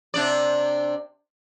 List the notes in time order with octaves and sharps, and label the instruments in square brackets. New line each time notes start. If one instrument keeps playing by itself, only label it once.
[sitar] C3 D4 D5